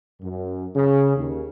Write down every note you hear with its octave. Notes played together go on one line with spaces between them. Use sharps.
F#2
C#3
D#2